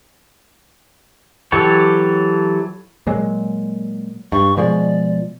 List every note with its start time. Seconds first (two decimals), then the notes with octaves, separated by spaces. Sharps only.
1.52 E3 F#3 G4 A4 C#5
3.07 A#2 F#3 G#3
4.32 G2 C#6
4.57 B2 F3 G#3 D5